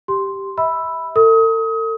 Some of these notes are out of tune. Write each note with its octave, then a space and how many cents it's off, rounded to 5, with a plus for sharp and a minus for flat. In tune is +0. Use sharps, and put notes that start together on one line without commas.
G4 +0 C6 +0
E5 -30 B5 +0 E6 +5
A4 +40 D#6 +30